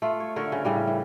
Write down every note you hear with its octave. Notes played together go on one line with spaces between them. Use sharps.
A3 F4
C#5
D3 A#4 C#5
C#3
A2 C#3 G3
E3